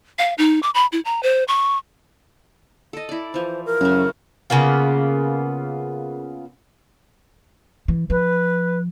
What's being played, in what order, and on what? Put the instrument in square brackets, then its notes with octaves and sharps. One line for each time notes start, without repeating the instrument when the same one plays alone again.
[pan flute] F5
D#4
D6
B5
E4
A#5
C5
C#6
[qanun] A4 D#5
E4 D5
[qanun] E3 F3 [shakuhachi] C5
[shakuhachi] A#4
[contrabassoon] F#2 [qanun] C#3 A3
[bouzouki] C#3 A#3 B3 F4
[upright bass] E3
[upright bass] F3 [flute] B4